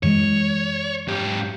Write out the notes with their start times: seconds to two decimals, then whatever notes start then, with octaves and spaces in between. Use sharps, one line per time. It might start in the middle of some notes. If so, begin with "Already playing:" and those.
0.03 F#2 E3 G#3 C#5
1.08 G#2 G4